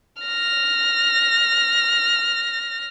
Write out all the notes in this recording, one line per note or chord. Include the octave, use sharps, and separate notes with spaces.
F6 A#6